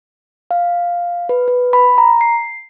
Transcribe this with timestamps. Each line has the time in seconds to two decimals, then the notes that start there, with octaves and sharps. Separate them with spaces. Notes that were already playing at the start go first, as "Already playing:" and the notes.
0.51 F5
1.29 B4
1.48 B4
1.73 B5
1.98 A#5
2.21 C7